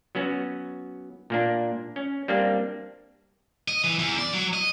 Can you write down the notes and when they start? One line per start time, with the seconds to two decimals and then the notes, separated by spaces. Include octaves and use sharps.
0.15 F#3 B3 C#4 F#4
1.30 A#2 A#3 D4
1.96 C#4
2.28 G3 A#3 C4 D4
3.68 D#5
3.84 E3
3.99 E2
4.18 D5
4.33 F#3
4.53 D#5